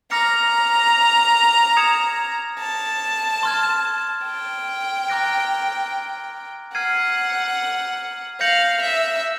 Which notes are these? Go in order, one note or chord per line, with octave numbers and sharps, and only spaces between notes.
A#5 D6 F6 A#6 C#7
D#6 G#6 C#7 E7
A5
C6 F6 G#6
G5
A#5 D6 F#6 A#6 D7
F#5 F6 G#6 C7 D#7
F5 G6 A#6 C#7 F#7
E5